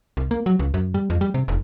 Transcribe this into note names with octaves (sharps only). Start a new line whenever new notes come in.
C2
A#3
F#3
C#2
F#2
G3
F2
G3
C3
F1